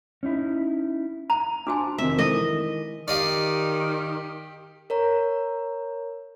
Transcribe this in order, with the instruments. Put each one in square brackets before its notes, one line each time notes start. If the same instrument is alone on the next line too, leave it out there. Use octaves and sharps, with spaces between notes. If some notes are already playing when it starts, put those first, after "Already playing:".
[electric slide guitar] C#4 D#4 E4
[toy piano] A#5 [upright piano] F7
[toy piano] D4 F#4 G#5 [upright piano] A5 C6 D6
[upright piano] F2 C3 D#3 [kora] E5
[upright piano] D#3 E3 G#3 [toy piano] A4 [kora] D#5
[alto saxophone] D#3 [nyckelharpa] G4 [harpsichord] D5 D#5 F5
[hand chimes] A#4 C#5 A#5